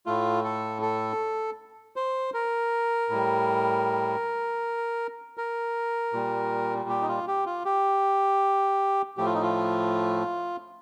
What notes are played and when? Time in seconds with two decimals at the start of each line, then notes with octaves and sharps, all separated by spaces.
0.06 A2 A3 F4
0.44 A4
0.82 A4
1.96 C5
2.34 A#4
3.10 A2 G3
5.37 A#4
6.13 A#2 G3
6.89 G4
7.01 D#4
7.08 F4
7.27 G4
7.46 F4
7.65 G4
9.18 A2 F3 A3 G4
9.25 F4
9.34 D#4
9.42 F4